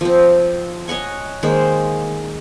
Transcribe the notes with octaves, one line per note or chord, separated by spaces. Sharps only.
F3 C4
C#5 D#5 F#5 G#5
D#3 G#3 A#3 C5